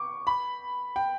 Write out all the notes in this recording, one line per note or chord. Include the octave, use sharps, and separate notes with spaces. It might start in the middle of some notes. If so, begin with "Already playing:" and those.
Already playing: C#6 D6
B5
G5